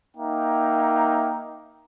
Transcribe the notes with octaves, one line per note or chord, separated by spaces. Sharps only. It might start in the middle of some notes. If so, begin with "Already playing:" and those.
A#3 D#4 E5 G5